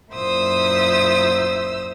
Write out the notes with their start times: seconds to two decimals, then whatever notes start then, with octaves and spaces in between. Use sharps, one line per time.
0.12 F#2 A#2 E4 C5 D#6 E6